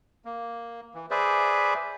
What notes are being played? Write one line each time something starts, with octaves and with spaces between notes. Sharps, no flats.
A#3
E3
G#4 B4 C5 D5 E5